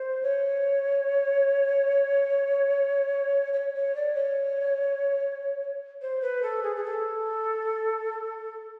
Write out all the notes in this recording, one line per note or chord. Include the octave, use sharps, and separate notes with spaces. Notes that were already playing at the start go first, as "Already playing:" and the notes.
Already playing: C5
C#5
C#5
C#5
D5
C#5
C5
B4
A4
G#4
G#4
A4